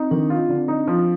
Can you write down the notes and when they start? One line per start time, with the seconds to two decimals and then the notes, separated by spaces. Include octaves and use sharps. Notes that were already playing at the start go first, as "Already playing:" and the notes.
Already playing: C4 D#4
0.11 D#3 D4
0.30 F4
0.49 D3
0.68 D#4
0.87 F3